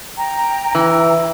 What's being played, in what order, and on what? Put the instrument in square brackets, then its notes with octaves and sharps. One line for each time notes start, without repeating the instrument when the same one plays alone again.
[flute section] G5 A#5
[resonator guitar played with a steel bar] E3